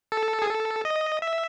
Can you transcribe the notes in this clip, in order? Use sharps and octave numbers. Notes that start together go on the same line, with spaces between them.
A4
G#4
A4
D#5
E5